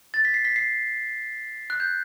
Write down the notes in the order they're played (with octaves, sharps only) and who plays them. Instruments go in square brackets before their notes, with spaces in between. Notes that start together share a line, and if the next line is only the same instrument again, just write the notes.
[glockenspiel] A6
B6
C7
B6
C7
F#6
G6